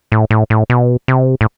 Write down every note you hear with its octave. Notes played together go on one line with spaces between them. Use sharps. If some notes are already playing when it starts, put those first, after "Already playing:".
A2
A2
A2
B2
C3
A2